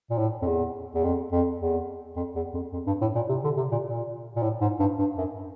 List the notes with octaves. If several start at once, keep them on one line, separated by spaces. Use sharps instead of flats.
A#2
A2
F2
E2
E2
F2
F2
E2
F2
E2
F2
F2
G2
A2
A#2
C3
D3
C3
A#2
A#2
A#2
A2
G#2
G2
G2
F#2